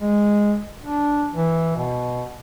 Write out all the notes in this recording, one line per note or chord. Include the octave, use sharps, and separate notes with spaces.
G#3
D4
E3
B2